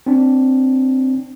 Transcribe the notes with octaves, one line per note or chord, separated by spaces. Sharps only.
C4 D4